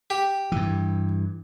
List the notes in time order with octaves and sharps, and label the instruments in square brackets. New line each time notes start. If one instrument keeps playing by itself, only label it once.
[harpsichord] G4
[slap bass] G2 E3